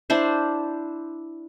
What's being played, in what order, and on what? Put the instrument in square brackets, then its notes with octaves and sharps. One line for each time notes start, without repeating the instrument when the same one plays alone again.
[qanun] D4 E4 C5